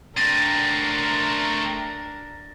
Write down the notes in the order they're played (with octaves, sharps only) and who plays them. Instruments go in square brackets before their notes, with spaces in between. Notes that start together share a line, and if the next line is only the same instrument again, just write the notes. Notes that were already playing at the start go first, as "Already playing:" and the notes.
[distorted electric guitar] A3 C4 [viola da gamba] D4 A#4 [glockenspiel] A6 A#6 D#7